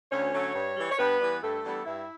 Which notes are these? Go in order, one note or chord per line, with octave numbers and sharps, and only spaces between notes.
D2 C#4 C#5
D3 F#3 A3 C#4
G2
E3 G3
C#5
G2 B3 B4
E3 G3
G2 A3 A4
E3 G3 B3 D4
G2 E4 E5